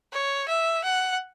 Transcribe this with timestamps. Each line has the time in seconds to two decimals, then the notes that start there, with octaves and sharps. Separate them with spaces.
0.13 C#5
0.48 E5
0.84 F#5